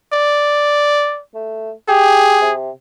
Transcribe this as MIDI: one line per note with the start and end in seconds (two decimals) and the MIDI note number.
0.13 1.21 74
1.34 1.71 57
1.89 2.40 67
1.89 2.53 68
2.41 2.70 48